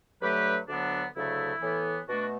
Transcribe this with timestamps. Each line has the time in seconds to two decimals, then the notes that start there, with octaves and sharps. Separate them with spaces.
0.21 G2 D3 F#3 A3 G4 B4
0.68 D2 D3 F#3 B3 D4
1.14 D2 C#3 F#3 A3 E4
1.61 A2 E3 B3
2.08 B2 A3 D4 F#4